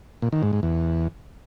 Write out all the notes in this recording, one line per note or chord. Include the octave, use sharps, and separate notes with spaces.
A#2
D#3
G#2
G#2
E2